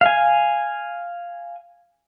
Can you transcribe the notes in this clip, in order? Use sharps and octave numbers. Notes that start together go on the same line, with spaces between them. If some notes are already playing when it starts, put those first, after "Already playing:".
F5 G#5